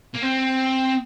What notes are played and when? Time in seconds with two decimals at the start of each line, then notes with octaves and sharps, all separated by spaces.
0.14 A#3
0.22 C4